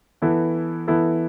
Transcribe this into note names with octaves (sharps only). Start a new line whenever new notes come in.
E3 B3 E4 A4
E3 B3 E4 A4